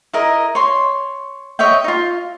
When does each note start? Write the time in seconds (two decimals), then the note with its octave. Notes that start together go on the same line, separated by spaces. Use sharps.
0.13 E4 A#4 D#5
0.55 C#5 C6
1.59 C#5 D#5 E5 G5
1.84 D#4 F4